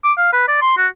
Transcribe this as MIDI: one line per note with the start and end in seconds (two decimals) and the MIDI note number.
0.04 0.13 86
0.18 0.31 77
0.33 0.46 71
0.48 0.57 74
0.62 0.76 84
0.78 0.88 66